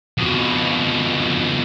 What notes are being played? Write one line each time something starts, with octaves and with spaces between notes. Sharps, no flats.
F2 B2